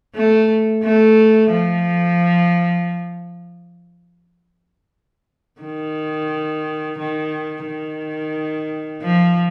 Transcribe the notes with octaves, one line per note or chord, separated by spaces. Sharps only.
A3
A3
F3
D#3
D#3
D#3
F3